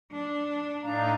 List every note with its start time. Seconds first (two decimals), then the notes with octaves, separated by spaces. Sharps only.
0.12 D4
0.82 A2 D4 D#4 F5 A#5